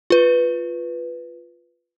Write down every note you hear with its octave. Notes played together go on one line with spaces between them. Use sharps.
F4 B4